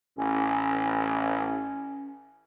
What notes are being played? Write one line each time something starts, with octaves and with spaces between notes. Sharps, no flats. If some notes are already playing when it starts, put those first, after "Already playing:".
A1 C#4